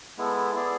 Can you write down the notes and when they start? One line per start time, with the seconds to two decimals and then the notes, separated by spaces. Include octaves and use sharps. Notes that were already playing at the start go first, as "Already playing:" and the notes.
0.17 G#3 B3 E4 A4
0.55 B3 E4 G#4 D5